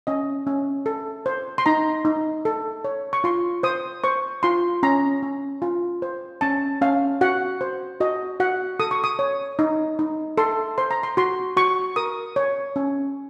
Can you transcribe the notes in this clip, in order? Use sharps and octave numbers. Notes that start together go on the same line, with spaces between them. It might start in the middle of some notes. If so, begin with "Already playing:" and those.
C#4 D#5
C#4
A4
C5
C6
D#4 A#5
D#4
A4
C#5
C#6
F4 C6
C5 D#6
C5 C#6
F4 C6
C#4 A#5
C#4
F4
C5
C#4 A5
C#4 F5
F#4 F#5
C5
F#4 D#5
F#4 F#5
A4 D#6
C#6
D#6
C#5
D#4
D#4
A4 C6
C5 C6
A#5
C6
F#4 C6
F#4 C#6
A#4 D#6
C#5
C#4